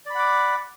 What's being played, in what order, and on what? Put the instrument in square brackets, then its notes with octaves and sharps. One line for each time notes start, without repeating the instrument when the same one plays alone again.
[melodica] D5
B5
F#5
D6